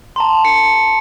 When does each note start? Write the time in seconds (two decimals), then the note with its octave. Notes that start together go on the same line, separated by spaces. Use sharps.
0.16 A5 A#5 C6
0.45 C#7